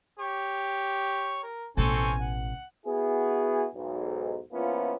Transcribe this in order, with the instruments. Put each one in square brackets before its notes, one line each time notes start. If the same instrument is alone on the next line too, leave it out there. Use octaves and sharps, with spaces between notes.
[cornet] G4 [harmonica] C#5
[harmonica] A#4
[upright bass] A1 B2 [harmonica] C4 C#4 A4 [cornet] G#5
[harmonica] F#5
[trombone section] B3 E4 F#4 G#4
B1 G#2
F3 A#3 B3 C#4 E4 F4